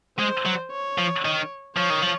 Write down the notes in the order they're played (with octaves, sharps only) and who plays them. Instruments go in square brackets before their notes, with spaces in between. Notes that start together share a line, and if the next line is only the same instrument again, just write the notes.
[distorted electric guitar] G#3 [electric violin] C5
[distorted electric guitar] F#3
[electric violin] C#5
[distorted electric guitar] F3
D#3
[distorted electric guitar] F3 [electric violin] C#5
[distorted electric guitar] D#3
F3